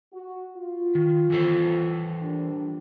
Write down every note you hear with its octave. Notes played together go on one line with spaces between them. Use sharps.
F#4
F4
D#3
E3 A4 C5
A#2 G3 D4